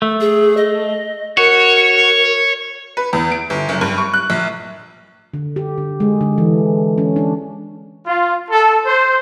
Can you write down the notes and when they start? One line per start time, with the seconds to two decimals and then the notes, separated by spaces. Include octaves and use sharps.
0.02 A3
0.21 G#4
0.57 D#5
1.37 F#4 A#4 C#5
2.97 B4
3.13 E2
3.32 D7
3.50 G1
3.69 F#1
3.81 G2
3.98 C#6
4.14 F#6
4.30 A#1
5.34 D3
5.56 G4
5.78 D3
6.00 G#3
6.21 D3
6.38 E3
6.98 C#4
7.16 D4
8.07 F4
8.51 A4
8.86 C5